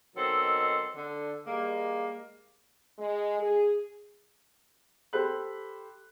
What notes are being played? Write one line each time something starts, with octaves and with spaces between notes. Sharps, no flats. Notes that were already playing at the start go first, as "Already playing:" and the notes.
B2 D#3 F#3 C4 A4
D3
G3 G#3 A#3
G#3
G#4
G4 A4 C5 B5 F#6